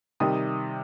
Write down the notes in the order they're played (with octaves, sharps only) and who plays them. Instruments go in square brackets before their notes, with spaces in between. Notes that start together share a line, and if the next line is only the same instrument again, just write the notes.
[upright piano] C3 D#3 G3 D#6